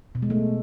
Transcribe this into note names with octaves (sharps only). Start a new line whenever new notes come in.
B2
G#3
A3